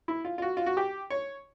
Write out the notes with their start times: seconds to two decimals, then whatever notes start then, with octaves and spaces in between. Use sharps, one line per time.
0.08 E4
0.25 F4
0.38 F4
0.42 F#4
0.57 F4
0.66 F#4
0.77 G4
1.10 C#5